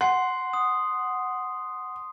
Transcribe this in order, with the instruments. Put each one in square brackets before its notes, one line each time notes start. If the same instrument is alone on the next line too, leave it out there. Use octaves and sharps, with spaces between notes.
[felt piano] F#5 [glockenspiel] C6 C7
[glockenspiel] D#6